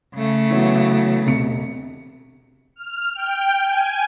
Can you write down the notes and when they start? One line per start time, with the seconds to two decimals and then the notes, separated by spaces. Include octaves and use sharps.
0.15 C#3 A3
0.50 E3 F#3 B3
1.26 E1 C3 C#7
2.76 F6
3.14 G5
3.63 G#5